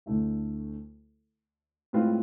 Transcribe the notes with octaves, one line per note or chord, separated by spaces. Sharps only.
D2 D3 A3 E4
A2 G#3 C4 F4 B4